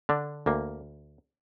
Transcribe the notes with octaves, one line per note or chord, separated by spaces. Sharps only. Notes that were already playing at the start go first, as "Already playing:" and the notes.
D3 D4
D2 A#3